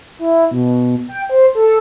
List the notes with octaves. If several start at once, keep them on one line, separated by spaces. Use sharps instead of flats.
E4
B2
G5
C5
A4